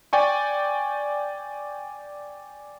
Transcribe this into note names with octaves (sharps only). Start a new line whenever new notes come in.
D5 G5 G#5 C#6